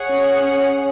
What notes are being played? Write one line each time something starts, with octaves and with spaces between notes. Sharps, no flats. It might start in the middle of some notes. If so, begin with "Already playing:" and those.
Already playing: G#4 C#5 F#5
C#4
C#4